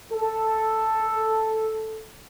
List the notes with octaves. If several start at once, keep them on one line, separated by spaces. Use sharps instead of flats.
A4